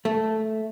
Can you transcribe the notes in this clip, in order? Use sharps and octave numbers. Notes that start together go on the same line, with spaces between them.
A3